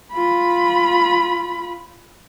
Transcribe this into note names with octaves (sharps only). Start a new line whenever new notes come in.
F4 B5